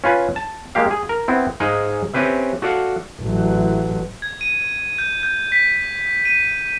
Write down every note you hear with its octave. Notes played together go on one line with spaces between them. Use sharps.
C#4 F4 B4 G#5
A5
G#3 A#3 G4 F5
G#4
A#4
B3 C4 E4
G#2 G#3 D#4 F5 G#5
C4 C#4 G4 B4 E5
F#4 A4 D5 F5 F#5
A1 F#3
G#6
D#7
G6
G6
B6
D#7